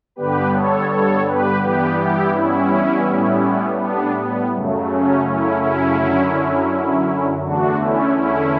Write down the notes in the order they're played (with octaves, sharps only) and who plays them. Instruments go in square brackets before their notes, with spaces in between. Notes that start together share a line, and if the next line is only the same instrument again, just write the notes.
[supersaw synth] G2 D3 G3 B3 G4 B4
A4 C#5
A4 C#5
G4 B4
G2 E3 G3 B3 G4 B4
E4 G4
C#4 E4
A2 G3 B3
B3 D4
B3
F#2 C#3 F#3 A3
C#4
C#4 E4
C#4 E4
F#2 D3 F#3
E2 D3 A3 D4 F#4
C#4 E4
C#4 E4